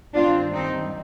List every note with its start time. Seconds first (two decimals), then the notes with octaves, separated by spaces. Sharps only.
0.13 G2 D#3 G3 C4 D4 F4
0.53 C4 D#4